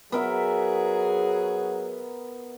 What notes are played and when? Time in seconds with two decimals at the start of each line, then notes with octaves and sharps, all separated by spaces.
0.12 F#3 B3 F#4 G#4 A#4 E5